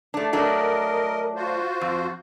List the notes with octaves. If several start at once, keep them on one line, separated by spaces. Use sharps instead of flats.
A3 D4
F#3 A3 D4 A#4 D#5
F4 F#4 C5
F2